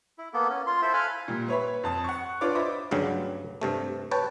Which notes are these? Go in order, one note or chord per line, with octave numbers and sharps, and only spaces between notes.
E4
A#3 B3 A4
C#4
F4 C6
E4 A4 C5 E5
A4 F5 G#5 B5 F#6
A#2 G3
B4 C#5 E5 B5
F2 A5 D#6
F#5 C#6
D4 F4 B4 C#5 D5 D6
C5 D#5 E5 B5 D6
D2 G2 C#3 F#3 G3
G2 C3 A3
B4 C#5 G5 A5